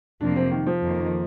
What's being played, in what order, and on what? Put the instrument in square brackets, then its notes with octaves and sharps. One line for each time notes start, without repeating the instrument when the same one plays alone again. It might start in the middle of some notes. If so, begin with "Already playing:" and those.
[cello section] F2 C3 F3 A#3 [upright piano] D4
[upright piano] C4
D#3
F3
[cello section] F2 D#3 A#3